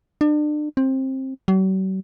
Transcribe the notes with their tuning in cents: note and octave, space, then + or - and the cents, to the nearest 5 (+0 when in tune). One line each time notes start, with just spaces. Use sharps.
D4 +35
C4 +20
F#3 +45